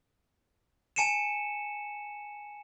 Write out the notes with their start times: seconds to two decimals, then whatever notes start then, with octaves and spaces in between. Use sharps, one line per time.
0.96 G#5 A5 C#7 D#7 E7